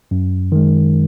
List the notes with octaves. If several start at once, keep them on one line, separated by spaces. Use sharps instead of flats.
F#2
D#3 G#3